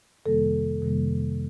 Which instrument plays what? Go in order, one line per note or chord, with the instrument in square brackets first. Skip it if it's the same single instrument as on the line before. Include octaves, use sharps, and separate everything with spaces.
[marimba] F2 C3 D#3 G3 A#3 A4
F2 C3 D#3 G3 A#3